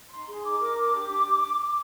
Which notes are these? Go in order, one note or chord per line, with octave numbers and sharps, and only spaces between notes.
D#4 C6
G#4 C6
D#4 D6
A#4 D6
D4
G4
D4